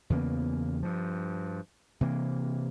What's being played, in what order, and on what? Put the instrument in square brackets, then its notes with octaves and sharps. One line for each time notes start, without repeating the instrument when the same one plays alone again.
[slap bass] E2 C#3 A#3 B3
G2 F3
C3 E3 A#3